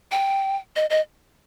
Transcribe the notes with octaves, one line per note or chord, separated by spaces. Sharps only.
G5
D#5
D#5